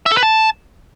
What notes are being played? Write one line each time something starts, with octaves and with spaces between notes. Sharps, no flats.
E5
A4
B4
A5